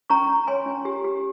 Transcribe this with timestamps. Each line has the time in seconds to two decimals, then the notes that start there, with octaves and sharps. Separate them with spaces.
0.10 C#4 A#5 C#6
0.29 C#4
0.47 C#5 G#5 C6
0.66 C#4
0.85 G4
1.04 G4